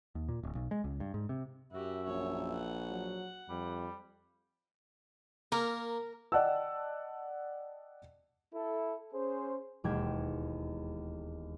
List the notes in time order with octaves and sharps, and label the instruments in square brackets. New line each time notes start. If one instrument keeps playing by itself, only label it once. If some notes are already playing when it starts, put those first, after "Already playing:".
[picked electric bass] D#2
A#2
D1
B1
G#3
C#2
G2
G#2
C3
[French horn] F#2 [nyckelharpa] F#4 G4 [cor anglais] E5
[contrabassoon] A#1 [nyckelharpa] C#5
[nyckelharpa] F#5
[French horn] F#3
[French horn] F2 [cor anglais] G3
[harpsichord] A#3 [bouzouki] A#4
[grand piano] D5 D#5 F#5 G5 A5 E6
[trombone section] E4 A4
C#4 G#4 C5
[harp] E1 D#2 G#3 G5 G#6